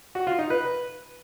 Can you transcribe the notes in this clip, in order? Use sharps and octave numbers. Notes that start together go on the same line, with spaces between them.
F#4
F4
D#4
B4